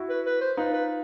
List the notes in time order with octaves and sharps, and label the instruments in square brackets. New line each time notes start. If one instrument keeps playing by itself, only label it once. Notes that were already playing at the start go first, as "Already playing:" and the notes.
Already playing: [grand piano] E4 F#4
[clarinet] B4
B4
C5
[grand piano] D#4 F4 [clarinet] B4
[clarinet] B4